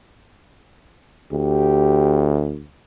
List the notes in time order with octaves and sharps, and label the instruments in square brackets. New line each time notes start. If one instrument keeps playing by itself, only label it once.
[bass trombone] D2 [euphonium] G4